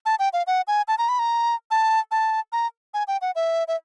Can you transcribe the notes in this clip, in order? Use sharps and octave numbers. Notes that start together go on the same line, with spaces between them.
A5
G5
F5
F#5
G#5
A5
A#5
B5
A#5
A5
A5
A#5
G#5
G5
F#5
E5
E5